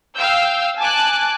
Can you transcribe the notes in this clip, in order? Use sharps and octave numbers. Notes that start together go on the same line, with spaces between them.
F5 G5 E6 G6
G#5 A5 D6 F#6